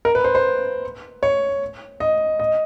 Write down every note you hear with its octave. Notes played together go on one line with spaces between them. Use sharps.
A#4
B4
C5
C5
C#5
D#5
D#5